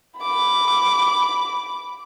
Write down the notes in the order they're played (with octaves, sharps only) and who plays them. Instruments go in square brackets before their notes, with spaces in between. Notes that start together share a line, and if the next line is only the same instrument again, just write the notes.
[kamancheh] B5 D6